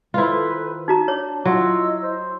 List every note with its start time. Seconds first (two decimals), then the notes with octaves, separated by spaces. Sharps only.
0.14 D#3 E4 F4 A4 B4 C5
0.88 D#4 F#4 A#5
1.08 D4 C#5 A5
1.45 F#3 E4 F4 D#5 E6
2.03 C5